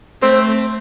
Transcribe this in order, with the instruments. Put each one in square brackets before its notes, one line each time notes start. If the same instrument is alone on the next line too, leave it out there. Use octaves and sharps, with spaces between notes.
[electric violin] A3 [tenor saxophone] C4